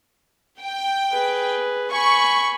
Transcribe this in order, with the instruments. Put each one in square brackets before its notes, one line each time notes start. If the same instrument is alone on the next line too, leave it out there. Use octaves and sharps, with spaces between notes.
[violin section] G5
[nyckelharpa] G#4 B4
[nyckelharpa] G#5 B5 [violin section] C#6